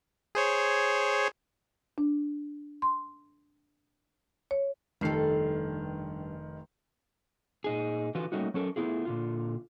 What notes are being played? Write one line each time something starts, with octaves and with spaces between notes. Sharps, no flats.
G#4 C5 C#5
D4
C6
C#5
F1 G2 D#3 A4 C7
A#2 D#4 G#4
D3 E3 F4 F#4 B4
G3 A3 A#3 C#4 D#4 F#4
F#3 C#4 A4 A#4
A3 B3 C4 E4 F4 G#4
A#2 D3 F4